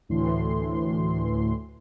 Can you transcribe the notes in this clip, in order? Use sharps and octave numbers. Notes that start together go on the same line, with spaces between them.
D2 A2 E3 C6